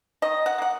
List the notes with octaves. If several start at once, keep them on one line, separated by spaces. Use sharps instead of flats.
D#3 D#5
F#5
A#3 F#5